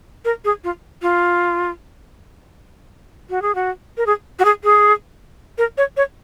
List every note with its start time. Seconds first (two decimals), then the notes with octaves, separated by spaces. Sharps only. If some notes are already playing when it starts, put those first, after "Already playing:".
0.25 A#4
0.45 G#4
0.64 F4
1.02 F4
3.30 F#4
3.42 G#4
3.55 F#4
3.97 A#4
4.06 G#4
4.39 F#4
4.45 G#4
4.64 G#4
5.58 A#4
5.78 C#5
5.97 C#5